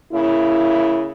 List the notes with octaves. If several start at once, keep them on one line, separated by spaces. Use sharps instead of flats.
C#3 A#3 E4